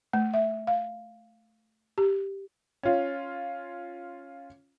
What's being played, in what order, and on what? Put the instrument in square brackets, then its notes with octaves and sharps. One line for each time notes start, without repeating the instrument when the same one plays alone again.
[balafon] A3
E5
F5
G4
[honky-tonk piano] C#4 F4